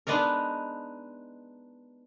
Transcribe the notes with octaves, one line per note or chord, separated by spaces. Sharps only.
G#3 B3 D4 D#4 A#4